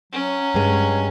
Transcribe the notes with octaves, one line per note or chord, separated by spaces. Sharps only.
F#3 C#4
G2 G#3